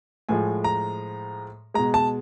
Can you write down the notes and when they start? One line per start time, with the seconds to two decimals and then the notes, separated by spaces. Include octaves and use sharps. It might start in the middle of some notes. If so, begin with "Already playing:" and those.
0.29 A2 F3 G#3 G#5
0.64 A#5
1.74 B2 G#3 A#5
1.94 A5